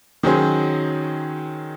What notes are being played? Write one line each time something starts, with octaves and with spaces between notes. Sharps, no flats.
D#3 F#3 C#4 G#4 C5